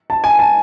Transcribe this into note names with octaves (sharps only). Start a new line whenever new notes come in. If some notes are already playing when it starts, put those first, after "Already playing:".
A5
G#5
A5